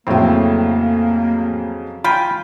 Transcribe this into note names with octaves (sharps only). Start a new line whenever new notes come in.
F2 A2 C#3 F#3 A#3 C4
F4 G5 G#5 B5